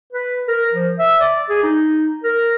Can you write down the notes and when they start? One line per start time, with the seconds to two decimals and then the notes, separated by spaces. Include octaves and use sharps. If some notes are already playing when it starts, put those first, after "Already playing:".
0.13 B4
0.48 A#4
0.73 F3
0.99 E5
1.21 D5
1.50 G#4
1.63 D#4
2.24 A#4